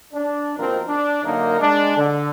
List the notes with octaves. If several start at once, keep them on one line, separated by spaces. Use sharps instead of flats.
D4
D#2 B2 F3 C4 A#4
D4
F#2 D3 A#3 D#4 A#4
G#3 D4
D3